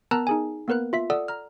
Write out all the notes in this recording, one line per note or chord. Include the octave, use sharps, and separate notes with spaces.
B3 A#4 A5 A#5 E6 F#6
D#4 G#4 G#5
A#3 B3 A#4 B4 F#6
F4 E5 B6
A4 D5 F#5 D#6 E6
A#5 F6